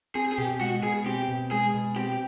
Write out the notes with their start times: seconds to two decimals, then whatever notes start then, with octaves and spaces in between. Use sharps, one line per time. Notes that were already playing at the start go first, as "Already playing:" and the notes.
0.15 C4 G#4
0.32 G#4
0.38 B2 G4
0.60 G#3 F#4
0.83 B2 G#4
1.06 C4 G4
1.28 B2
1.51 G#3 G#4
1.74 B2
1.96 C4 G4